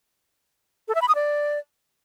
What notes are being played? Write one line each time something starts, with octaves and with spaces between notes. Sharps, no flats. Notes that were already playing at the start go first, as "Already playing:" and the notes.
A4
E5
B5
D#6
D5